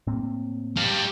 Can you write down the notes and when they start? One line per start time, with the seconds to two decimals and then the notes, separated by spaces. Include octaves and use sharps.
0.07 A2 A#3 C4
0.77 G3 F5